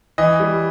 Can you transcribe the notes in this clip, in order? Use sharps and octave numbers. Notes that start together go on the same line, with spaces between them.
E3 D#5
G3